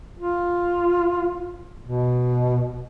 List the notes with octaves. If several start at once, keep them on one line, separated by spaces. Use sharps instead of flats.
F4
B2